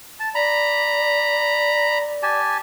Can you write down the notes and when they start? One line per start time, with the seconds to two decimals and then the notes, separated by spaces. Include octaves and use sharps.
0.20 A5
0.35 D5 A#5 B5
2.23 G4 G#5 A5